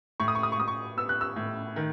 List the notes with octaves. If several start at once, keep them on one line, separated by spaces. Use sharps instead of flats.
A2 C#6
D#6
C#6
D#6
C#6
A2 D#6
C#6
B3 E6
F#6
E6
A2
D#3